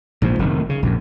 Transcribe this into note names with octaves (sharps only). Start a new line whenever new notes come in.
A#1 G#2 F3
F1 D#3
C#3
A#1 F#2